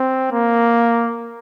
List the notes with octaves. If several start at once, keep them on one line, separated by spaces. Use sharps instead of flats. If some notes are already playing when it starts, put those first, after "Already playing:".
Already playing: C4
A#3